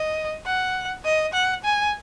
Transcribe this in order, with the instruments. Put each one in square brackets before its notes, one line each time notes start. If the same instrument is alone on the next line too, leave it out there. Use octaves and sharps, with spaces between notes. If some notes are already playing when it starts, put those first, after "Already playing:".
Already playing: [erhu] D#5
F#5
D#5
F#5
G#5